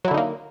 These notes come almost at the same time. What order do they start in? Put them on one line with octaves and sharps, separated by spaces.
F#3 E4 D3 D#4 A#3